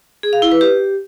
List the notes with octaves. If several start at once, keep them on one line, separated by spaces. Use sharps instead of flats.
G#4
F5
E4
B4
G4